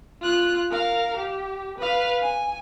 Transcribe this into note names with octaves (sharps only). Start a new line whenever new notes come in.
F4 F#6
A#4 F5
G4
B4 F5
G#5